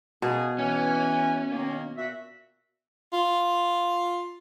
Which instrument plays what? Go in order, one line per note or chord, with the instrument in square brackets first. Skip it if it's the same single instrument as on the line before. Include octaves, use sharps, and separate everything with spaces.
[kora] B2 [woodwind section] A#3 C#4 G#4
[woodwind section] E3 G#5 [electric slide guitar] C#4
[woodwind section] D#3 A#3
A#2 F#4 E5
[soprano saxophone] F4